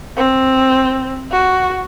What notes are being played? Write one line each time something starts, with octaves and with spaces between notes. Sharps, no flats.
C4
F#4